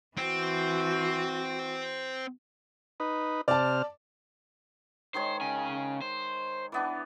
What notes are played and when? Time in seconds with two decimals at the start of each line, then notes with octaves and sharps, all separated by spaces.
0.17 E3 C4 F#4
3.00 D#4 B4
3.48 C3 D5 A5 F6
5.14 D#3 G#3 C5 C#5
5.41 C#3 G#5
6.02 C5
6.72 E3 B3 D4